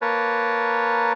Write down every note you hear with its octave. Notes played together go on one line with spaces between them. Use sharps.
A#3 A#4 B4 C#5 A5